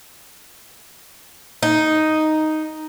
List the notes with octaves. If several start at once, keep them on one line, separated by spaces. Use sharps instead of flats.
D#4